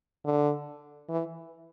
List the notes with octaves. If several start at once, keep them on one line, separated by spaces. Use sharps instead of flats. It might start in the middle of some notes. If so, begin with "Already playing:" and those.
D3
E3